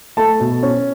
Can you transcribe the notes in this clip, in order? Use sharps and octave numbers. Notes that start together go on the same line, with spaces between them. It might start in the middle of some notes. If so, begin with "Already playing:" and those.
A3 A5
B2
C#4